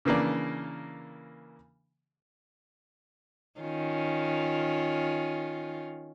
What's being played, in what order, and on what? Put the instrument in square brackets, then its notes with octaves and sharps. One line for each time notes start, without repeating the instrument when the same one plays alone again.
[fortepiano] C#3 E3 A#3 D4 D5
[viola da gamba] D#3 C#4 F4